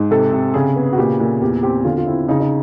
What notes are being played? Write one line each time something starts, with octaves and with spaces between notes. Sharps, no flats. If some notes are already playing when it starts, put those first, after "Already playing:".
Already playing: G#2
C3 A4
C3
C#3 G#4
B3
F#4
A#2 G4
A#2
E2 G4
C4 G4
D3 F4
F4
C4 E4
C#3 D#4
D#4